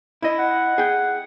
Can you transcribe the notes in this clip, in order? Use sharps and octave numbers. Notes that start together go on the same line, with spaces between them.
E4 D#5
F#5
G#4 G5